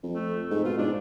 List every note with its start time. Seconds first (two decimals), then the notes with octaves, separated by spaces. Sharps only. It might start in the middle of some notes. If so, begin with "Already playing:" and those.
0.03 F2
0.15 A3
0.50 G#2 A3
0.65 B2 F4
0.78 G#2 D4